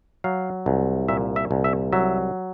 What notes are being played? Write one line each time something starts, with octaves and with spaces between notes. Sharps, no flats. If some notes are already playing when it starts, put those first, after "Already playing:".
F#3 F5
C2
A#2 E5
E5
C2
E5
F#3 E5